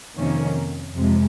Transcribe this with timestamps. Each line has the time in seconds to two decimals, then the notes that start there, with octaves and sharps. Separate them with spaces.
0.18 F2 C3 D#3 A#3 C#4
0.97 F2 C3 F3 G#3